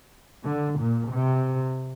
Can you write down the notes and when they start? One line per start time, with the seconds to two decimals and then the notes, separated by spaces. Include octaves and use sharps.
0.43 D3
0.77 A#2
1.10 C3